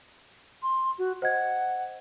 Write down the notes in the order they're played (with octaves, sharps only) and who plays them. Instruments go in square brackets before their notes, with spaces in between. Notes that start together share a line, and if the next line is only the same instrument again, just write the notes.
[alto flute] C6
F#4
[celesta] C5 D#5 G#6 [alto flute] F#5